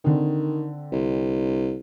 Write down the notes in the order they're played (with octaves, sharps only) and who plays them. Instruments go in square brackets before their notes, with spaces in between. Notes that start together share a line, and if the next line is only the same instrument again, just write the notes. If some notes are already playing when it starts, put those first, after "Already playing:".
[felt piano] D3 C4 [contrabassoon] D#3
[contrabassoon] C2